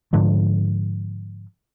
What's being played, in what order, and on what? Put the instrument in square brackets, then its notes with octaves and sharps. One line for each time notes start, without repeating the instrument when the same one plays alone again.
[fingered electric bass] G#2 D3 F3